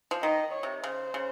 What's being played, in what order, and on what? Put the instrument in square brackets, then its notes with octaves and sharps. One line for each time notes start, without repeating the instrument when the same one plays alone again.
[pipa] F3
[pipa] D#3 [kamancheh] D#5
[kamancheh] C#5
[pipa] C3
[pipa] C#3 [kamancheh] C5
[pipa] C#3